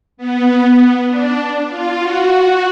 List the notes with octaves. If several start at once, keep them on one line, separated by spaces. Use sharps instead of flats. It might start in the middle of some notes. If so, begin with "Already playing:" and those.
B3
D4
F4
F#4